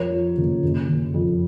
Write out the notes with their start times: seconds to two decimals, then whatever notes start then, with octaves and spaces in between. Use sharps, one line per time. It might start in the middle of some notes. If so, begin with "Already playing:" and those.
Already playing: F2 A#4 C#5
0.10 F3
0.37 F#1
0.63 F#1
0.88 F#1
1.14 F2